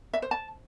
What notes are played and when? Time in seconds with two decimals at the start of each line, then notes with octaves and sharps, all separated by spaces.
0.13 E5
0.22 C5
0.31 A5